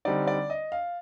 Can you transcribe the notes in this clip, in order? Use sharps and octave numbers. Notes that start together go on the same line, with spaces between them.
D3 G3 C4 D#4 D5
D5
D#5
F5